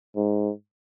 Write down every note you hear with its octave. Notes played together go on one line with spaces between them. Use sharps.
G#2